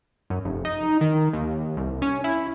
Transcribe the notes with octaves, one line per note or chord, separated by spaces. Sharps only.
F#2
F1
D#4
D#3
D#2
C2
C#4
E4